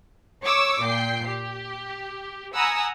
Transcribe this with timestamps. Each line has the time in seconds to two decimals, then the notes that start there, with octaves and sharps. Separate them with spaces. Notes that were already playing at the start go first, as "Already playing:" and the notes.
0.43 C#5 C#6 D6 E6
0.82 A#2 G5 C7
1.27 G4
2.54 F#5 G#5 A#5 B5 D#6 E6